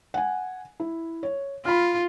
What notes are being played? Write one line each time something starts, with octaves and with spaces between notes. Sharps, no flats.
F#5 G#5
E4
C#5
F4 B5 F6